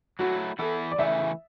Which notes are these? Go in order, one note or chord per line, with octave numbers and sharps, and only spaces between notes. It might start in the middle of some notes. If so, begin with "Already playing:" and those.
F#3 A3 E4 F#4
E3 B3 E4 A4
D5
C#3 E3 A3 E5